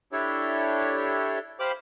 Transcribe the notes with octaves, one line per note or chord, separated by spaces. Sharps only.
D4 E4 G4 A4 C#5
G4 C5 F5 B5 D6